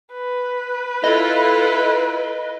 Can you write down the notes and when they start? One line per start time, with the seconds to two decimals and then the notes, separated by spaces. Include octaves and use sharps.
0.12 B4
1.04 E4 F4 A4 D#5